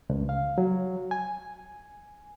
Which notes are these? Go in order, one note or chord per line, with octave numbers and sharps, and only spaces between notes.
C#2
F5
F#3
G#5